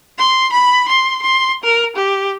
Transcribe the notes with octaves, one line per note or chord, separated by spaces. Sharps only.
C6
B5
C6
C6
A#4
G4